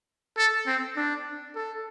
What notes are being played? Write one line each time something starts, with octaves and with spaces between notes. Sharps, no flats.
A4
C4
D4
A4